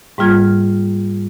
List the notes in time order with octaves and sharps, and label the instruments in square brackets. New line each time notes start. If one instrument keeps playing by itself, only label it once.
[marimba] G#2 G3 A#3 F4 F6 G#6